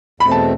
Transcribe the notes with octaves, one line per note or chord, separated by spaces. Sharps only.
E2 B2 A3 C4 B5
A5